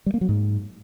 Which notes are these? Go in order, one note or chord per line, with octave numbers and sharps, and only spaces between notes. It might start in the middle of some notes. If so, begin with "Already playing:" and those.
G3
A#3
F#3
G#2